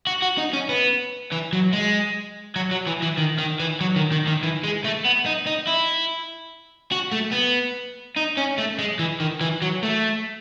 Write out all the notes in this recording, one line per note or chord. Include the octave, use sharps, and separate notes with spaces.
F#4
F#4
D#4
C#4
B3
E3
F#3
G#3
F#3
F#3
E3
E3
D#3
D#3
E3
F#3
D#3
D#3
D#3
E3
G#3
A3
B3
D#4
D#4
E4
F#4
A3
B3
D#4
C#4
A3
G#3
E3
D#3
E3
F#3
A3